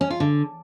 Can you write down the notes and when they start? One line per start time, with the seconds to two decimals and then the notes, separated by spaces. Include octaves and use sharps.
0.01 C#4
0.10 F4
0.20 D3